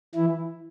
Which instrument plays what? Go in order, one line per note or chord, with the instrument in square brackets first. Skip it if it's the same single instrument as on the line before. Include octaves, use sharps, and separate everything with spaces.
[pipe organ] E3 E4